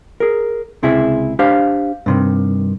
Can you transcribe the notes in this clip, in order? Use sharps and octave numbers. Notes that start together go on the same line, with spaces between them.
G#4 A#4
C#2 C3 E4 G#4 E5
D4 G4 C5 F5
G2 C3 D#3